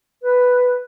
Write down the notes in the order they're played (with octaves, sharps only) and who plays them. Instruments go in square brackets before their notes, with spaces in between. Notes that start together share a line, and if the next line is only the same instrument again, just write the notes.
[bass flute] B4